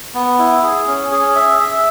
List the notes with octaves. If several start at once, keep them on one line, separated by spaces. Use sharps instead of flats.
B3
E4
G#4
C#4
G#4
E5
E5